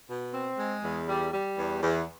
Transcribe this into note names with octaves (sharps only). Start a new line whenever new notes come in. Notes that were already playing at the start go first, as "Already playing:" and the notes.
B2
C4
G#3
E2
G3
G3
E2
E2